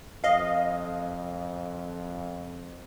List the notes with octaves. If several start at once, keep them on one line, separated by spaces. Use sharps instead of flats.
F2 D#5 F5